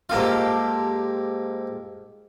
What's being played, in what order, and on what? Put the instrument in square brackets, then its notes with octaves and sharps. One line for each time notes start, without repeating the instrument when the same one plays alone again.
[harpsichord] G#2 A#3 F5 [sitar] F4 G4 A4